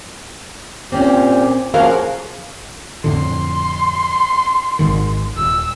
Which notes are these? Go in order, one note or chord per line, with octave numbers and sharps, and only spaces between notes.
A#2 C4 C#4 G4
F3 A#3 C#4 F#4 G#4 A#4 C5 F5
F2 A2 D3 C6
G#1 G#2 D#3
D#1 E6